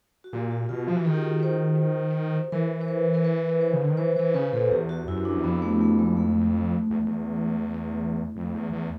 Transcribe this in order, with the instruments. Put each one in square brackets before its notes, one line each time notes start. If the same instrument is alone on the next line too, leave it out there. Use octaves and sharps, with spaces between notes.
[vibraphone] F#4
[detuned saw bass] A#2 [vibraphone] G4
[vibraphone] F#4
[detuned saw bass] B2 [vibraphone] F4
[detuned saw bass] F3 [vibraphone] F#4
[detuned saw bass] E3
[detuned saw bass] D#3 [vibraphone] G#4
[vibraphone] G4
G#4
C5
[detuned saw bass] E3 [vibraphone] A#4
[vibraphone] C5
B4
A#4
B4
C5
[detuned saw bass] C#3
D3
D#3
[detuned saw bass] E3 [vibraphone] C5
[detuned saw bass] E3 [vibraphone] C5
[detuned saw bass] C#3 [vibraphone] B4
[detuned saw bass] A#2 [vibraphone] A4
[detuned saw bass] E2 [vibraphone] G4
[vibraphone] F#4
[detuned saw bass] F#2 [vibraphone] E4
[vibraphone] D4
[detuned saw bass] E2
[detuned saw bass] F2 [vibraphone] B3
[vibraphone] A3
A3
G#3
A3
[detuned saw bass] E2
E2
F2
E2
E2